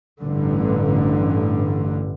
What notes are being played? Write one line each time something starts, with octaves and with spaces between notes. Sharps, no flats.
A1 G2 D3